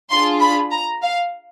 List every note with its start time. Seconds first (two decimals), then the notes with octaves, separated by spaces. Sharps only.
0.11 D4 F4 G#4 C6
0.41 B5
0.72 A#5
1.03 F5